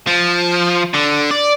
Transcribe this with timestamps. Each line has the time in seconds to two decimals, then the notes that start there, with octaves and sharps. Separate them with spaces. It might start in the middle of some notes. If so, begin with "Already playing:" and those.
0.07 F3
0.94 D3
1.31 D5